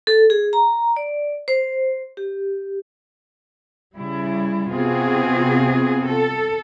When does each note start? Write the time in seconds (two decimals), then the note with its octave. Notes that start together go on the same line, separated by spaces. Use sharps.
0.07 A4
0.30 G#4
0.53 A#5
0.96 D5
1.48 C5
2.17 G4
3.97 C#3 G3 E4
4.71 C3 B3 C4 F4 F#4 G#4
6.11 A4